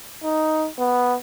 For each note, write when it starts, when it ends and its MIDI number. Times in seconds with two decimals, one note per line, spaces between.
0.23 0.67 63
0.79 1.15 59